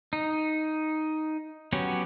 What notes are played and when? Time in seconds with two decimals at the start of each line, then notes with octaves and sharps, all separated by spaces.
0.13 D#4
1.73 F#3 B3 C#4 G4